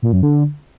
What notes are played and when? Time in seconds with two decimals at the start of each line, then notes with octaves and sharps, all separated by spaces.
0.03 A#2
0.13 F#2
0.23 D3